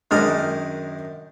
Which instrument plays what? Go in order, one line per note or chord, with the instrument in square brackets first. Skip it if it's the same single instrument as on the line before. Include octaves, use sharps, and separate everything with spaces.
[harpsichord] F#2 D#3 D#5 [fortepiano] G#3 D4 F6